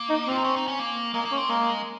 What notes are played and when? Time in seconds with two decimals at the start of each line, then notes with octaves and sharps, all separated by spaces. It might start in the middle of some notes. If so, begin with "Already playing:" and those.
Already playing: A#3
0.10 D#4
0.27 C4 F4
0.37 D#4
0.44 C#4
0.56 D#4
0.68 C#4
0.79 A#3
1.14 G#3 A#3
1.25 A#3
1.32 C#4
1.37 C4
1.49 G#3 A#3